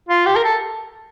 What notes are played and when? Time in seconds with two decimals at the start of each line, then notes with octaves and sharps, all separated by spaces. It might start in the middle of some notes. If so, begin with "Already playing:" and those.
0.09 F4
0.26 G4
0.36 A#4
0.44 A4